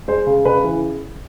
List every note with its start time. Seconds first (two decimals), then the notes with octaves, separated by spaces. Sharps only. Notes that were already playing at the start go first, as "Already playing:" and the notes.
0.08 G#3 C5
0.27 C#3
0.45 C#3 B4
0.64 E3